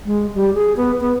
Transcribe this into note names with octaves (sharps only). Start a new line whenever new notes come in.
G#3
G3
G#4
B3
B3